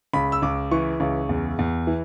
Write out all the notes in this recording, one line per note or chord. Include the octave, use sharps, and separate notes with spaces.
C#2 B5
E6
C#2 D6
E3 C#6
C#2
E2
E2
E3